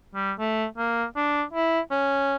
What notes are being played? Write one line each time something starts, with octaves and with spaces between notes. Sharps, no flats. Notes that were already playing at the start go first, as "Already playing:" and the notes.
G3
A3
A#3
D4
E4
C#4